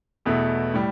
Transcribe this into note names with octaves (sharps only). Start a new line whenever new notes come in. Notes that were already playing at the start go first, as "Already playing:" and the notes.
E2 B2 A3 E4
A2 G3